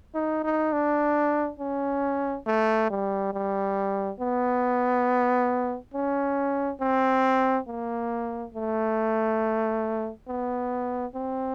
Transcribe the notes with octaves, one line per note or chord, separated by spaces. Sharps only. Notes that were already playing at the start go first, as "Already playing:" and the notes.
D#4
D#4
D4
C#4
A3
G3
G3
B3
C#4
C4
A#3
A3
B3
C4